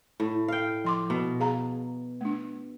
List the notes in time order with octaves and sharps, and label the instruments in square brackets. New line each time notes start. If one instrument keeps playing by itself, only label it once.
[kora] A2
F5 G5
[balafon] F3 C6 D6
[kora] B2
[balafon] G#4 F5 A#5
A3 D4